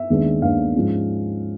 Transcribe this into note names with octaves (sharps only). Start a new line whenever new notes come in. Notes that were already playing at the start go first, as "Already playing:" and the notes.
Already playing: E5
D#2 D#3 G#3 B3 D4
D#2 D#3 G#3 B3 D4 F5
G#2 F3 G#3 C#4